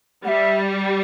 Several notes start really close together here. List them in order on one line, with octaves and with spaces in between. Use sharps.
G3 F#5 E5